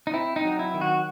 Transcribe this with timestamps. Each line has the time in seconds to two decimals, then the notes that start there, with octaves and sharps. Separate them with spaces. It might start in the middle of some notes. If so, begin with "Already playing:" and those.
0.07 D#4
0.14 C4 E4
0.36 D#4
0.45 F#3
0.59 E4
0.74 D#3
0.81 F#4